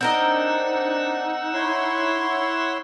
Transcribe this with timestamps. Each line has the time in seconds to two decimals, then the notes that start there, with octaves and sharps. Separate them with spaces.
0.01 C4 D4 D#4 A#4 D#5 F#5 E6
1.54 E4 C#5 C6